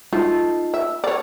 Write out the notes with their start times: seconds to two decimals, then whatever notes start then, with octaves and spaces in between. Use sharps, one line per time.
0.13 A3 D#4 F4 A4
0.74 E5
1.04 C#5 D5